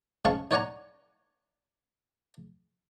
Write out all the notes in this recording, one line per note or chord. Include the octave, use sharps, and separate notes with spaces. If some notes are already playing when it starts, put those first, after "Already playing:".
G#2 C#3 C#4 F5 A5 C#6
D#4 C#5 D5 F#5 G#5 A#5